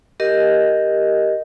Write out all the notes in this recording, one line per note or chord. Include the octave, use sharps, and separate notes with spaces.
G4 A#4 D#5